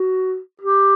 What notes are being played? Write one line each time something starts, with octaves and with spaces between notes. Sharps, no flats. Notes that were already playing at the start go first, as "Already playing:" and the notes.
Already playing: F#4
G4